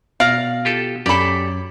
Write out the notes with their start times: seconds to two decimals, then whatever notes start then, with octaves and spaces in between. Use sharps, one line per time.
0.20 B2 D5 F5 A#5
0.65 F4 G4 A4
1.06 F#2 G4 A4 D5 B5